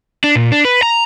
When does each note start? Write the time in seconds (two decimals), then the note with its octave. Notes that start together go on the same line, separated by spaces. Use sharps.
0.24 D4
0.36 A#2
0.52 D4
0.65 B4
0.83 A#5